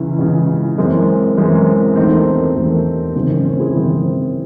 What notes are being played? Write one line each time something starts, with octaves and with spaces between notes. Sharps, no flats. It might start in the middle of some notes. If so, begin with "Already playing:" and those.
Already playing: C#2 C#3 E3 C#4 E4
C#2 C#3 E3
F#2 E3 G#3 C4
F#2 E3 G#3 C4
E1 D#2 D#3 A3 C4 D#4
E1 D#2 D#3 A3
G#1 F#2 C#3 E3 C4
C#4
C4
E4 G#4
G#1 F#2 C#3 E3 C4